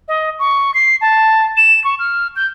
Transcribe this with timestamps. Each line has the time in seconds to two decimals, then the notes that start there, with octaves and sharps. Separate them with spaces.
0.08 D#5
0.39 C#6
0.74 C7
1.01 A5
1.57 E7
1.84 C#6
1.99 F6
2.36 G6